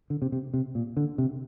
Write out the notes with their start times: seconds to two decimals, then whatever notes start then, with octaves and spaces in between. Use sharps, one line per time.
0.10 D3
0.22 C3
0.32 C3
0.54 C3
0.75 A#2
0.97 D3
1.18 C3